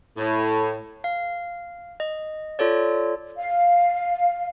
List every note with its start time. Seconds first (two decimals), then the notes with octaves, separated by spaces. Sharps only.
0.17 A2
1.04 F5
2.00 D#5
2.59 F4 A4 C#5 D5
3.37 F5